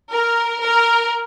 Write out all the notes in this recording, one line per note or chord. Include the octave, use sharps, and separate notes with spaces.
A#4
A#4